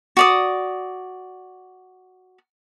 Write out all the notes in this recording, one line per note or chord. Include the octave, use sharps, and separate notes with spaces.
F#4 D5 D#6